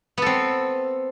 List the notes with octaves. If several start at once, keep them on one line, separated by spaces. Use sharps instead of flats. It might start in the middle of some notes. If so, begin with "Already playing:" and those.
B3 C4 A4